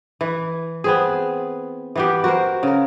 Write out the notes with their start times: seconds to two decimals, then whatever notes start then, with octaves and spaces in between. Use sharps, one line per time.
0.21 E3
0.84 B3 C4 G#4
1.95 E3 B3 G4
2.24 F#4 A#4 C5
2.63 C#3 A#4